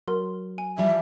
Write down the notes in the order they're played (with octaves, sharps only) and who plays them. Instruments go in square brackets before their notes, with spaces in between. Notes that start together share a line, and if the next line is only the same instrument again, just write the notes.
[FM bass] F#3 [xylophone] A#4 C6
[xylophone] G#5
[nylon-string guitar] E3 F3 G3 [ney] E5